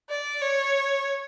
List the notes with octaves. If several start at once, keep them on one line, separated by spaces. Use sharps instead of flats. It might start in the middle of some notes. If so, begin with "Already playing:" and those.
D5
C#5